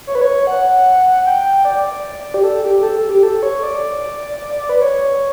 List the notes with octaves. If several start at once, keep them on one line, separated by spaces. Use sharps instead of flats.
C#5
B4
C#5
F#5
G5
D5
G4
A4
G4
A4
A4
G4
A4
C#5
D5
B4
C#5